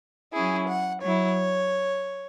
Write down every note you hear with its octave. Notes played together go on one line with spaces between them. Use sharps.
F#3 C#4 E4 G#4
F#5
F#3 E4 C#5